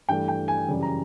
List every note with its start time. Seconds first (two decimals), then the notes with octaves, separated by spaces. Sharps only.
0.08 G2 E3 A3 G5
0.28 G5
0.48 G#5
0.68 F#2 C#3 E3 G3
0.83 A#5